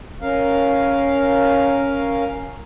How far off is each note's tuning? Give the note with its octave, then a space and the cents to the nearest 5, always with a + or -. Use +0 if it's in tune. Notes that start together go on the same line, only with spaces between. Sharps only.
C#4 +0 A#4 +0 F5 +0